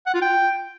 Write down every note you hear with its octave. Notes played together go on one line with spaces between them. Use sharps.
F#5
F4
G5